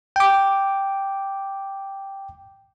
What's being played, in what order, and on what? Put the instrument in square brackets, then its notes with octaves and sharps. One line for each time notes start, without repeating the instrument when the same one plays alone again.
[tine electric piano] G5 D6